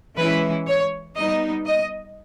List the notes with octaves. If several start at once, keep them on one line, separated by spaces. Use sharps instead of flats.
E3 G#3 C#4 E4 B4
C#5
G3 B3 D#4 D#5
D#5